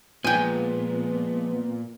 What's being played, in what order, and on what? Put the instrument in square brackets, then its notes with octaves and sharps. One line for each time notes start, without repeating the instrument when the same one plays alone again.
[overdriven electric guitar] A#2 [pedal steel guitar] F3 G#3 [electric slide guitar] B3 [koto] G5 G#5